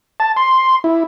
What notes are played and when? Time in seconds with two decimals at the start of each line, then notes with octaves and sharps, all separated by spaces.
0.20 A5
0.37 C6
0.84 E4